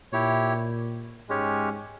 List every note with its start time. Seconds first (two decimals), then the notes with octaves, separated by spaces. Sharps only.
0.12 A#2 E4 G4 C#5
1.29 G#2 G#3 C#4 G4 C#5